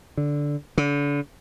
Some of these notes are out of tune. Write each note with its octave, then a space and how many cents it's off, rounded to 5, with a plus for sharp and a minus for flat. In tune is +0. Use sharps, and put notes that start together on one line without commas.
D3 -5
D3 -35